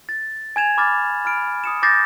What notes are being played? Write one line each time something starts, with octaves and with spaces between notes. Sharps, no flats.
A6
G#5 G#6 E7 F7
B5 D6 F6 G#6 A6
B5 F6 D7
D#6 C#7 E7
D6 G6 A6 A#6 C7